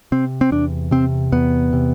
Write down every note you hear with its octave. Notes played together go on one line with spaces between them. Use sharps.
C3 C4
C4
E2 D4
C3 C4
E2 B3
C3